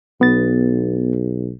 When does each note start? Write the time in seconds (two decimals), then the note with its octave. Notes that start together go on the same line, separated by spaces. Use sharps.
0.21 B1 B3 A6